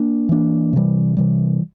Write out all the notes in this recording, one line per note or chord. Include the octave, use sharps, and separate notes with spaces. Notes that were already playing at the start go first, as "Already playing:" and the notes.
Already playing: A#3 D4
E3 A#3 D4
C3 E3 G3
C3 E3 G3